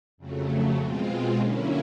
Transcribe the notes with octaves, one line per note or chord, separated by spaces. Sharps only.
F2 C#3 F#3 A3
B2 G#3 C4 F4
D3 F#3 A#3 C#4 E4